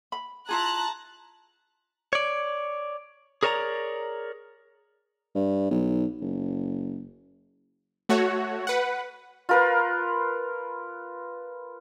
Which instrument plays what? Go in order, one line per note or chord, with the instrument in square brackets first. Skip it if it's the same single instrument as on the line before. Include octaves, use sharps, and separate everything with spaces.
[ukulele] B5
[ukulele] E4 F4 G#4 [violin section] A5 A#5 F#6
[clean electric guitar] C#5 D5
G#4 A#4 C#5 D5 A5 A#5
[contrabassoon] G2
B1
F#1
[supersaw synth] A3 F#4 C#5
B4 F#5
[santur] F4 A#4 B4